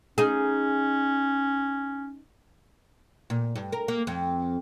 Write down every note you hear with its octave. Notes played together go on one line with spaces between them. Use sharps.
C#4 D#4 G#4
A#2
G2
A#4
A#3
F2